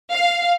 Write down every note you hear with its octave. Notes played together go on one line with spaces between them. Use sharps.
F5